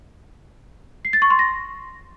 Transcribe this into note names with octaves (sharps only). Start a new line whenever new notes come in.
C7
A6
C#6
C6
A#6